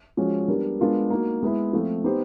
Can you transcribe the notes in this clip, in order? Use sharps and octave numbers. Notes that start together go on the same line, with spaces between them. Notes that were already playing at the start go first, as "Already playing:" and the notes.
F3 G#3 C#4 F#4
G3 B3 D4 G4 A#4
G#3 B3 D4 F4 A#4
A#3 D#4 F#4
G#3 B3 E4
F3 A3 C4 F4
B3 D#4 G4 C5